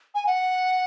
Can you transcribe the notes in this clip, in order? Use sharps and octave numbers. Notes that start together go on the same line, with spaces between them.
G#5
F#5